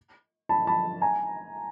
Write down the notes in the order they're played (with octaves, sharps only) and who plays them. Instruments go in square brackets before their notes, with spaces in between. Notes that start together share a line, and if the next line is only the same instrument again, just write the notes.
[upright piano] A5 B5
A5 B5
G#5 A#5